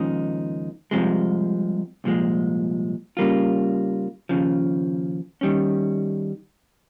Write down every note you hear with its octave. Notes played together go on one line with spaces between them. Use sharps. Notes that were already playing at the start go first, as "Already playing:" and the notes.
Already playing: D#2 C#3 F3 G#3 D#4
C2 C3 F3 G#3
C2 A#2 F3 G#3
C#3 G3 A#3 F4
D#2 C#3 F3
D#3 G3 C#4